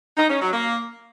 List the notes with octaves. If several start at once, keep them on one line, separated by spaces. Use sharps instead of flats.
D#4
C#4
F#3
A#3